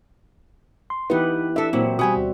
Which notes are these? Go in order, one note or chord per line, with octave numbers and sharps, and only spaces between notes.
C6
E3 B3 D#4 E4 G4 B4
D4 A4 E5
A#2 F#3 C4
B2 G3 F#4 G4 E5 G#5 B5 D#6
D2